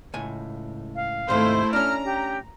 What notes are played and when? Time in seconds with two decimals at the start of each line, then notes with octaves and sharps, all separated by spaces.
0.14 C#2 A2 G#5
0.95 F5
1.29 D#2 G#2 C3 A3 E4 C5
1.73 C#4 D4 A#5 F6
2.05 G4